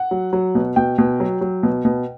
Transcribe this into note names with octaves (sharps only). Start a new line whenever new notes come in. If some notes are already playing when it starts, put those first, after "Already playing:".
Already playing: F#5
F#3
F#3
B2
B2 G5
B2
F#3
F#3
B2
B2